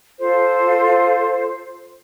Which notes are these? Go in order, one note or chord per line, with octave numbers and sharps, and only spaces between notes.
F4 A4 C5